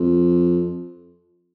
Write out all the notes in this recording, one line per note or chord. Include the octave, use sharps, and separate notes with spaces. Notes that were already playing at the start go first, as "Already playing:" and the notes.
Already playing: F2